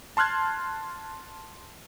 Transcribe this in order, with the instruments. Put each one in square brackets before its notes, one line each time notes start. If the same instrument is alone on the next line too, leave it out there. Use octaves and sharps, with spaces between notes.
[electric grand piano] A5 C6 F6 F#6 G#6